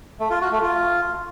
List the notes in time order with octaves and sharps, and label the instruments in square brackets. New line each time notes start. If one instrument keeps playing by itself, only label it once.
[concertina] A3
F4
F#4
A3
F4